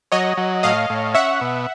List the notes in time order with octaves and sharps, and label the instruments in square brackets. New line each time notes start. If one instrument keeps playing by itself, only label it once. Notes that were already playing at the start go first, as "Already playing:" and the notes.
[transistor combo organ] F#3 [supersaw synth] C#5 D#5
[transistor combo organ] F#3
[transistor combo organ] A2 [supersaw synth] D#5 F5
[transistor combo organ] A2
[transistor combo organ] C#4 [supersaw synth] E5 F#5
[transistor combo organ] B2